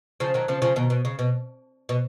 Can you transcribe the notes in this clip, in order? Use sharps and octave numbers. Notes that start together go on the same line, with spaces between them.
C#3 F3
D#3 F#3
C#3 F3
C#3 F3
B2 D#3
B2
C#3
B2
B2